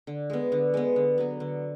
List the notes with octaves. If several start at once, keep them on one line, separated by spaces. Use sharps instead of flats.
D3
G#3 B3
D3
G#3 B3
D3
F#3 B3
D3